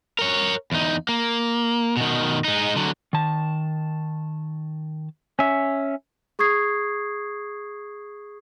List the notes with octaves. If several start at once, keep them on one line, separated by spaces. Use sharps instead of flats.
A#4 C#5
E2 D#4
A#3
B2 D#3
G#3 D#4
D3 F#3
D#3 A5
C#4 E5
G#4 C#6 D#6 G#6 C7